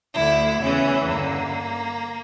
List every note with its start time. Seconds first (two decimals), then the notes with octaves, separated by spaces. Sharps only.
0.14 D2 D3 E4
0.61 E2 C#3 E3 C#4
1.07 G2 D3 A#3